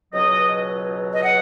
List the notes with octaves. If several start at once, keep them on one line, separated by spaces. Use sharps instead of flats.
C#2 B2 F#3 D#5
D#5
F#5